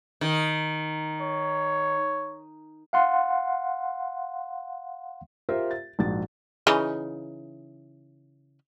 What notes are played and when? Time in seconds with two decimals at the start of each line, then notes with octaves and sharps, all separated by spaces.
0.21 D#3
1.21 C#5
2.93 F5 F#5 C6
5.49 F4 G4 A#4 C5 E5
5.71 A6
5.99 A#1 G#2 F#4 A6
6.67 C#3 E3 D#4